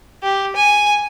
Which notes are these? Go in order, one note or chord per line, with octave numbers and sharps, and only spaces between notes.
G4
G#5